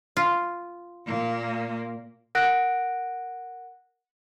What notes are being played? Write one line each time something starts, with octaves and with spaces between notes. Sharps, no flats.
F4
A#2 A#3
A#4 F#5 F#6 A#6 D7